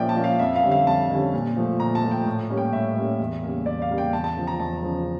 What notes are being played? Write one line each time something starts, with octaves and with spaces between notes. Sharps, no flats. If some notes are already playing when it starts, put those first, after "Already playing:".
Already playing: A#2 F3 A#3 C#4 D5 E5 G5
A5
F3 A#3 C#4
F5
F2 E5
F5
D3 G3 C#4
F5
F2 A5
D3 G3 C#4
A#2
F3 A3
A#2 A#5
A5
F3 A3
G5
A2
G3 A#3 C#4
G5
A2 E5
G3 A#3 C#4
E2
C#3 G3 A#3
E2 D5
F5
C#3 G3 A#3
G5
E2 A5
A5
C#3 F3
A#5
E2 A5
C#3 F3